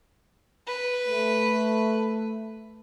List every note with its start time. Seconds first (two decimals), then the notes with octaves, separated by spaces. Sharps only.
0.67 B4
1.08 A3